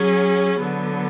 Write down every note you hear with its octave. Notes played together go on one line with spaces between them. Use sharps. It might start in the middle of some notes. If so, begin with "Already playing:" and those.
Already playing: F#3 C#4 G#4
D3 F#3 B3